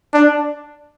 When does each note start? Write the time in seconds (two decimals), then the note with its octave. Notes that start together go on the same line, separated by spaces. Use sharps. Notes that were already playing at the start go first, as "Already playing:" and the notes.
0.13 D4